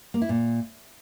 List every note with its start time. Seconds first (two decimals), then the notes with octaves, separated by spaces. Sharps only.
0.14 A#3
0.22 E4
0.29 A#2